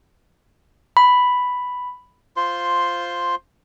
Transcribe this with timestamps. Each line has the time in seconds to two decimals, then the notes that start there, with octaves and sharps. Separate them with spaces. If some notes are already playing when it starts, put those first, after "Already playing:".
0.97 B5
2.36 F4 C5 C6